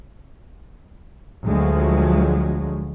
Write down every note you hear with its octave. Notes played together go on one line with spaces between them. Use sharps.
D2 F3 F#3 G#3